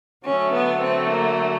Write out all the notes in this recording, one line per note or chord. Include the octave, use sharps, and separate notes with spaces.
D3 F#3 A3 C#4
B3
C4
A#3